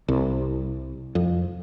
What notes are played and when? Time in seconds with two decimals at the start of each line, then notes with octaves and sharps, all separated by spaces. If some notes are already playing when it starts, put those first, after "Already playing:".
0.08 C2
1.15 F2